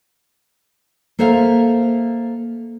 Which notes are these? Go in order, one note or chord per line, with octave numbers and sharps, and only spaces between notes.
A#3 A4 C5 E5 F5